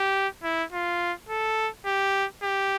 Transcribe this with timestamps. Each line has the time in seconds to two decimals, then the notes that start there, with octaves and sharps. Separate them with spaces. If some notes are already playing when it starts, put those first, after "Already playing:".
Already playing: G4
0.44 E4
0.73 F4
1.29 A4
1.86 G4
2.42 G4